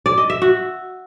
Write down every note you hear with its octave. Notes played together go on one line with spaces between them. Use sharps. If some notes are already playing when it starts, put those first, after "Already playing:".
D5
D#5
E5
F#4